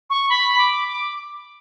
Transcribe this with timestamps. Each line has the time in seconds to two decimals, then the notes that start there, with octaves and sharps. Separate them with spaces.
0.10 C#6
0.29 B5
0.58 D6
0.88 D6